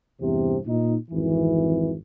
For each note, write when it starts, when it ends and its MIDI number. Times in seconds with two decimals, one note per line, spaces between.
0.21 0.57 40
0.21 0.57 43
0.21 0.57 48
0.67 0.95 46
0.67 0.95 63
1.10 1.94 32
1.10 1.94 41
1.10 1.94 52